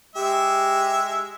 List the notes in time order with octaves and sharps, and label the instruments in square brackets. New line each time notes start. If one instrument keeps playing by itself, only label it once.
[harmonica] G#3 E5 [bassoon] G4